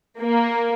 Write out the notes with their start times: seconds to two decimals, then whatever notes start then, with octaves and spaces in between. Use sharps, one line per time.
0.20 A#3